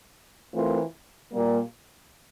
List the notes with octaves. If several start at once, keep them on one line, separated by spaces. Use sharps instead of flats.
E3 A3 C4 F4 A#4
A#2 G3 A#3